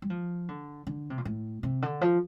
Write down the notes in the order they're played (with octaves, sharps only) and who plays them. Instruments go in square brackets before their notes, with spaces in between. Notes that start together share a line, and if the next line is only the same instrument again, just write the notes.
[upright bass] G3
F3
D3
D3
C3
A#2
A2
C3
D3
F3